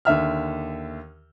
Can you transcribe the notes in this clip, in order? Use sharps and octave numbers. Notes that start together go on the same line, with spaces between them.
D#2 D3 E5 F6